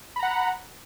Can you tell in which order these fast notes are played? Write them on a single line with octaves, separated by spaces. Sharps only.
B5 A#5 F#5